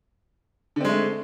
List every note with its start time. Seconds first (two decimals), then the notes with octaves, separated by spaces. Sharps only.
0.76 D3
0.80 C4
0.85 G#3
0.89 A3